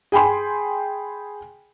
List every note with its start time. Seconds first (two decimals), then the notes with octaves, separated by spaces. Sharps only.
0.12 G#4 G5 G#5 B5 C6